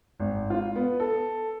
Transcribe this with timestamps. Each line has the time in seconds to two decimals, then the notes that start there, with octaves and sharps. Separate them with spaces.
0.20 G#1
0.50 F4
0.76 B3
1.00 A4